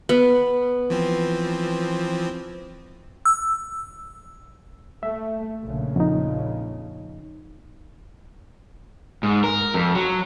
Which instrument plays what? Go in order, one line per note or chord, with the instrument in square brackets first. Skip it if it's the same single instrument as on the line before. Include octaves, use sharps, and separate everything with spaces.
[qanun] B3
[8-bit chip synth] E3 F3 C4
[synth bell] E6
[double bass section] A3 [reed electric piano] E5
[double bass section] A#1 C#3
[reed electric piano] F2 D#4
[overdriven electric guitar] G#2
A#4
F2
F#3